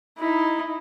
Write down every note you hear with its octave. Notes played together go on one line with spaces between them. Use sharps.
D#4 E4